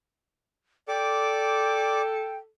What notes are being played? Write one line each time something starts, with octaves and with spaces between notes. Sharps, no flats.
A4 D5 G5 D6